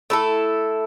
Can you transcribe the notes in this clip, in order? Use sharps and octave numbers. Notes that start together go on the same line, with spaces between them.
A3 E4 A4